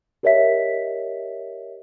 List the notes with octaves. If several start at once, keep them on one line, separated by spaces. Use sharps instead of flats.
G4 A#4 C#5 D#5 E5 B6